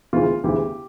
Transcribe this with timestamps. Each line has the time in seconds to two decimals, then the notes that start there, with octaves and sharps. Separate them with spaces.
0.13 E1 D2 C#3 E3 F4
0.44 E1 D2 C#3 E3 G4